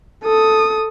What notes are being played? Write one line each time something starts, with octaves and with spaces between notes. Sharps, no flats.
A4 D#6